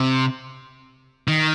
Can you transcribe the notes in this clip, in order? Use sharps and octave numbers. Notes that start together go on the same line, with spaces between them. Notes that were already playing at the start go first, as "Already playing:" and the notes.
Already playing: C3
D#3